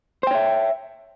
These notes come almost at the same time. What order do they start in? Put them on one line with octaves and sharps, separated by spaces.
C5 G5 C#5 E5